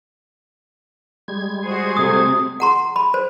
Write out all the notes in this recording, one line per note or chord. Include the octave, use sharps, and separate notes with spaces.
G3 G#3 G#6
F#4 G#4 C5
C3 A3 D#6
F#5 A#5 C6
B5
C5